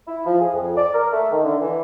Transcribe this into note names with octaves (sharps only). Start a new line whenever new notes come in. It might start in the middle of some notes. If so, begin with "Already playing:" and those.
E4
F3
G#4
F2
D5
A#4
A3
D#3
D3
E3